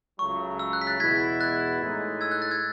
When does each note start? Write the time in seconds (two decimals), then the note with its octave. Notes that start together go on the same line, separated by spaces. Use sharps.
0.19 C#2 C#3 F#3 A3 C#6
0.59 E6
0.73 F#6
0.81 B6
0.87 F#6 A6
1.00 E2 B2 G#3 B3 E4 G#6 B6
1.41 F#6 A6
1.81 A2 G#3 D#4
2.21 E6 G#6
2.32 F#6
2.42 F#6 A6
2.51 E6 G#6